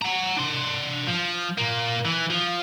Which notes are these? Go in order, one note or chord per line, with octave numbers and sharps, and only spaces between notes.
F#5 A#5
D4 C6
F3
A#2 A#3
E3
F3